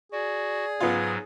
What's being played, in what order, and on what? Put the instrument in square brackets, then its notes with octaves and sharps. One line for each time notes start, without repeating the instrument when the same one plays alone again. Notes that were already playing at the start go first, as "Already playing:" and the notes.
[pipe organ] F#4 [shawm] G#4 [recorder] D5
[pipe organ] G#2 F#3 [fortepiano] B3 F4